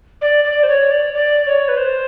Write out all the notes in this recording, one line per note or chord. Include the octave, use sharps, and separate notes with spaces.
D5
D5
C5
C#5
D5
D5
C#5
B4
C5